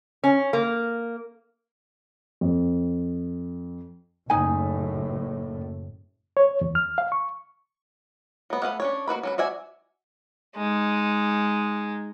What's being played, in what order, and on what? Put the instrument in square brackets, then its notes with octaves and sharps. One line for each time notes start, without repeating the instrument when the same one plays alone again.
[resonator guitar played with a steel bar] C#4
A#3
[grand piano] F2
[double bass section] F#1 A2 [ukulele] D#4 G#5
[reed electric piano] C#5
E2
F6
F5
C#6
[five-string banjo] F#3 B3
A3 B4 F5 F#5
C#4 D4 C#5
A#3 F#4 B4 B5
F#3 C#4 B4
F#4 D5 E5 G#5
[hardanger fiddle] G#3 D#4